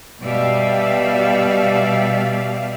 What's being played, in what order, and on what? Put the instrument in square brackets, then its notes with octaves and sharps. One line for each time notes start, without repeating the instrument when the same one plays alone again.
[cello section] B2 G3 D5 E5 F5